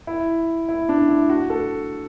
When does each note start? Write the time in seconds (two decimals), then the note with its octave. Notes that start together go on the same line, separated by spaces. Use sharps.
0.07 E4
0.69 E4
0.89 D4
1.09 E4
1.30 F#4
1.50 A4